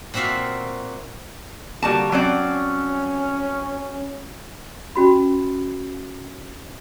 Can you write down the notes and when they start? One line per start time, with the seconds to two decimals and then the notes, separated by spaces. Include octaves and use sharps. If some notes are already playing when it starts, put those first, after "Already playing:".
0.14 A#2 C4 F#4 E5 F5
1.82 D3 G3 A#3 F#4 A5
2.12 F#3 C4 C#4 D5
4.95 C#4 F#4 B5